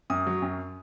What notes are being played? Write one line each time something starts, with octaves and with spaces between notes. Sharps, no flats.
F#2 D#6
F#3
F#2